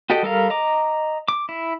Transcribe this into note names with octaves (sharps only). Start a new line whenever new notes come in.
F#4 G4 A4 D#5 G5
G3 A4 A#4 F5
D#5 A#5 D6
D6
E4